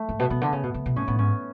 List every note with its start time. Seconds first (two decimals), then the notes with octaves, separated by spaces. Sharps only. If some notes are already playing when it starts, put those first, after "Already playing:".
Already playing: A3
0.09 G#2
0.19 B2
0.30 B2 B3
0.41 D3
0.52 C#3
0.63 B2
0.74 C#3
0.86 B2
0.96 A2 C#4
1.07 A2 B3
1.18 G#2 C#4